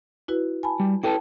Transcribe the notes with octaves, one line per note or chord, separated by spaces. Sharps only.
E4 F#4 B4
G#5 A5 B5
G3
E4 A4 B4 G5 A5